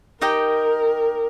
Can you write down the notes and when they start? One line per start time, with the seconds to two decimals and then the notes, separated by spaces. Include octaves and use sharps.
0.21 D#4 G4 A#4 D#5 G5